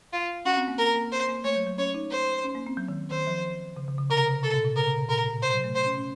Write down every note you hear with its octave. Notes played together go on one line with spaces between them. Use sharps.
F4
C#4 F#4
C4
A#3
A#3 A#4
A#3
C5
A#3
A3 C#5
F#3
F#3
C#4 C#5
D#4
C5
C#4
A#3
C4
F#3
D#3
D#3 C5
F3
C#3
C#3
C#3
C3 A#4
C#3
C3 A4
A#2
C3
C#3 A#4
C3
A#2
A#2 A#4
A2
C3 C5
F#3
A3
C5
C#4
C#4